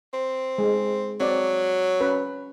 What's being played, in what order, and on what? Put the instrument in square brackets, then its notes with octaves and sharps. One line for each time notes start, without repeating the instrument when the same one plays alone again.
[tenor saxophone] C4
[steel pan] G#3
[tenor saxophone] F#3 [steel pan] C4 D5
[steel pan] C#4 B4 B5